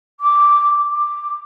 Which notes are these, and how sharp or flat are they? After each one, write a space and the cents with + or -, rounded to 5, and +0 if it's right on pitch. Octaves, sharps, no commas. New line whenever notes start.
D6 -5
D6 +10